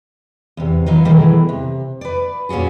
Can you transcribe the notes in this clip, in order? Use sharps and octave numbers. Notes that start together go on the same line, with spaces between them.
E2 C3
E3 F#3 D#4 F4
B2 D#3 E3 G3 A3 G#4
C3
B4 D5
A#2 C#4 F4 F#4 G#4